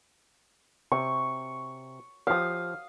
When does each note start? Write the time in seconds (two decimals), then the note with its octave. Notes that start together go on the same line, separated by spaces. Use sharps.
0.92 C3 C#6
2.27 F3 G4 F5 D#6